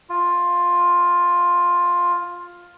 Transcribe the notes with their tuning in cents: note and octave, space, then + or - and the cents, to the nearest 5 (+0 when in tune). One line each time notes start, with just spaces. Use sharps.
F4 +10